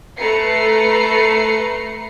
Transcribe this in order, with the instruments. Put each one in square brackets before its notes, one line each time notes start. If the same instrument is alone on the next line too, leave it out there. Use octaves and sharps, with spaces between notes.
[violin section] A3 A4 B4 A#5 C7 C#7